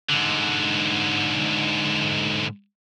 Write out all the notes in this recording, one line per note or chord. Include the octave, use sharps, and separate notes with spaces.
G#2 D3